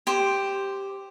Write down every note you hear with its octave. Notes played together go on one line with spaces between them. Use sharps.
G4 C5